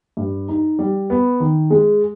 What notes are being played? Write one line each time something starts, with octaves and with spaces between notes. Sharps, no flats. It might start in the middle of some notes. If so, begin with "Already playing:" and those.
G2
D#4
G3
B3
D#3
G#3